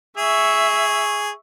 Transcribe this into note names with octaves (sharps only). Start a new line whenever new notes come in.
G#4 E5 C#6